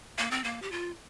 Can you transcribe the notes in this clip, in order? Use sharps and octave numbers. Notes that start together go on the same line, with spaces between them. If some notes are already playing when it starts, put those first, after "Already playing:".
A#3
C4
A#3
G4
F4